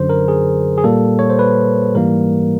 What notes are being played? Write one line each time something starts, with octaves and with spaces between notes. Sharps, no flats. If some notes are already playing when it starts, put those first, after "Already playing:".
Already playing: F#2 D3 F#3 C5
A#4
G#4
G#4
A#2 G3 A#3 A4
C#5
C5
B4
G#2 E3 G3 A#3 A#4